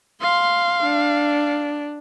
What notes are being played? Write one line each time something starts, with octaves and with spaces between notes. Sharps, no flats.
F5 C6
D4